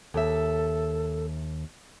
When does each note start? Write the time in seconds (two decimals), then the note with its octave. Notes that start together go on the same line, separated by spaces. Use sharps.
0.14 D#2 A4 E5